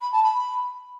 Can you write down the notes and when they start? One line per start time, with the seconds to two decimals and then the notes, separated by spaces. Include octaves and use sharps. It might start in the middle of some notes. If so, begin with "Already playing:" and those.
0.01 B5
0.12 A5
0.24 B5